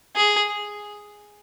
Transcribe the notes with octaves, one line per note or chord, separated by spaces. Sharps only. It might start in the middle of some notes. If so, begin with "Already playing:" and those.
G#4